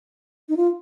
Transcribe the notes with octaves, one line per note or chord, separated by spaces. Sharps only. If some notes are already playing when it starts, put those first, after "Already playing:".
D#4
F4